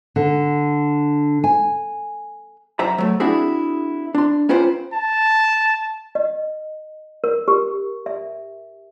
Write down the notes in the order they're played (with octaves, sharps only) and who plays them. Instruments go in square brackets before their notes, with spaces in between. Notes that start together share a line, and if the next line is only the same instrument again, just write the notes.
[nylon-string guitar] D3
G#5
[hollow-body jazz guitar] F#2 C5 E5 A#5
F#3 A3
C4 D4 E4 F#4 G#4 E5
D4 C6
A#3 C#4 F4 B4 C5 G5
[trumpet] A5
[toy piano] D#5
A#4
G4
E5